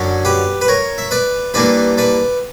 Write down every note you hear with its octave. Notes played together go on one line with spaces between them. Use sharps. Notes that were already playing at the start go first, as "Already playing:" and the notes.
Already playing: F#2 D3 F#3 C#4
G4 B4
B4
A#4 C#5
E5
B4 D5
G2 E3 A#3 D4 B4 D5
B4 D5